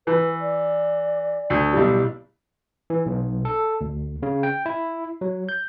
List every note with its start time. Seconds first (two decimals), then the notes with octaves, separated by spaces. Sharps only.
0.07 E3 B4
0.41 D5
1.50 D2
1.73 B1 G3 E4
2.90 E3
3.06 B1
3.45 A4
3.81 D2
4.23 C#3
4.43 G5
4.66 E4
5.21 F#3
5.49 G6